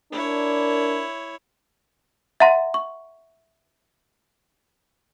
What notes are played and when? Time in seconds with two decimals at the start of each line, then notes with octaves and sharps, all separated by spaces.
0.12 D4 E4 A#4 C#5
2.40 E5 F#5 A#5 C6 A#6
2.74 C#6